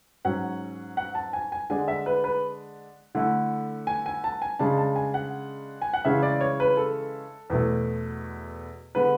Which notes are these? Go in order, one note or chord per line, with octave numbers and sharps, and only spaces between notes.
G#2 F#3 C#4 F#5
F#5
A5
G#5
G#5
D3 G#3 D4 G#5
E5
B4
B4
D3 A3 E4
G#5
G#5
A5
G#5
C#3 G#3 D4 A5
A5
G#5
F#5
G#5
F#5
C#3 E3 G#3 C#4 E4 E5
D5
C#5
B4
A4
E2 B2 A3
D3 G#3 B3 B4